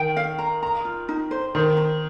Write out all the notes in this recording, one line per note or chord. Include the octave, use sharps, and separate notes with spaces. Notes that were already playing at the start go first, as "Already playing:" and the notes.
Already playing: D#3 G5
F5
A#5
A#5
F4
D#4
C5
D#3 C5
D#4